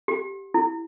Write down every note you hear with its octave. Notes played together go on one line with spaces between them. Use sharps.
G4
E4